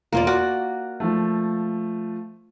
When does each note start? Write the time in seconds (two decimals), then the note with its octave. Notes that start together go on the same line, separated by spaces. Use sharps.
0.12 E1 A#3 F4 D5
0.27 F#4 D5 F6
1.00 F3 A3